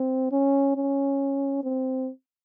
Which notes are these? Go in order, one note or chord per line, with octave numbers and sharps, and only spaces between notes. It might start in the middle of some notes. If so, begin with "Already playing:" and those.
Already playing: C4
C#4
C#4
C4